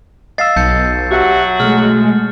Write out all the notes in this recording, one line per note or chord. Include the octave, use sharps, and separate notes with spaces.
D#5 F5 E6 A6 C7
B1 A5 G6 C#7
F#3 F#4 G4 E5 F#5
B2 G#3 A3 F6